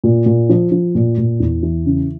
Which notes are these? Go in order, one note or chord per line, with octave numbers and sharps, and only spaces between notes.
A#2
A#2
F3
F3
A#2
A#2
E2
E3
C#3